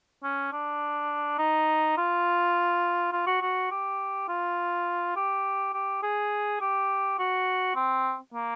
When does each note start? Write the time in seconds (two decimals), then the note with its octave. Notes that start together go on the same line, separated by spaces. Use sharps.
0.24 C#4
0.52 D4
1.39 D#4
1.97 F4
3.13 F4
3.27 F#4
3.42 F#4
3.71 G4
4.28 F4
5.16 G4
5.73 G4
6.03 G#4
6.61 G4
7.19 F#4
7.76 C4
8.34 A#3